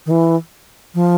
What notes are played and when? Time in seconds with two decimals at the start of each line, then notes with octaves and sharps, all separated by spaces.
0.06 D#3
0.11 E3
0.94 F3